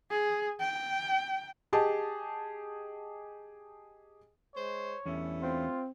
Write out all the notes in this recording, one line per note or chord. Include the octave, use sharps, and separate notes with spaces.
G#4
G5
G4 G#4 D#5 A5
G#3 C5 C#5
E2 G2 A3 C#4 E4
C4 F4